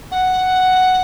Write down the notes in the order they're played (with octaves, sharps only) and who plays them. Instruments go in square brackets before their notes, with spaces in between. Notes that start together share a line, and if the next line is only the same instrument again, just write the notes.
[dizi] F#5